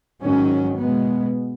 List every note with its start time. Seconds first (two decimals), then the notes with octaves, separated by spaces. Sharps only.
0.21 G#2 D#3 F#3 C#4
0.78 B2 G#3 B3